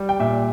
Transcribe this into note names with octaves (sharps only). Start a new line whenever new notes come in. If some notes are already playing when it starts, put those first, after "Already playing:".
Already playing: G3
G5
A#2 E5